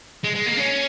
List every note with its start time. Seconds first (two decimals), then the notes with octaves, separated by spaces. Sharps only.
0.24 G#3
0.35 G#3
0.46 A#3
0.57 C#4